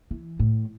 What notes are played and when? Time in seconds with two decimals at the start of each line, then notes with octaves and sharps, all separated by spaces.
0.11 E3
0.39 A2